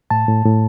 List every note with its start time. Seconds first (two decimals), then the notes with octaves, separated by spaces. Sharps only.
0.11 A2 A5
0.28 A2
0.45 A2